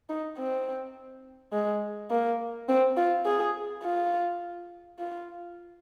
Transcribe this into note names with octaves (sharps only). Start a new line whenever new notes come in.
D#4
C4
G#3
A#3
C4
F4
G#4
F4
F4